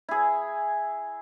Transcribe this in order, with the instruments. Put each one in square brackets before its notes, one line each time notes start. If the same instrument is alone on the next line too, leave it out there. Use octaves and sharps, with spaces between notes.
[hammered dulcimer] E4 G#4